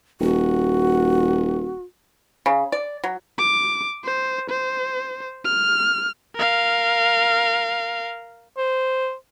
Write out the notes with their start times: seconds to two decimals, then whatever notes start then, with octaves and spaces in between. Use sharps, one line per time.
0.21 D#1 F#4
2.46 C#3
2.72 D5
3.04 F#3
3.38 D6
4.04 C5
4.50 C5
5.45 F6
6.36 A#4 F5
8.58 C5